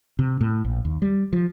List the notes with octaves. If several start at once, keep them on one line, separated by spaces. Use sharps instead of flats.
C3
A2
A#1
D#2
G3
F3